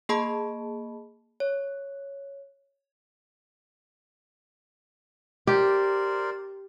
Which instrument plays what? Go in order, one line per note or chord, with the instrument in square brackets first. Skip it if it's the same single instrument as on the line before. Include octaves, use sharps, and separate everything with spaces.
[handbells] A#3 G#4 D#5 A5 B5
C#5
[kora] G4 [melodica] A#4 C5 D5